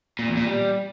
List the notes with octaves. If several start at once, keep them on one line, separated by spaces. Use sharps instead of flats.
A#2
E2
A#2
G3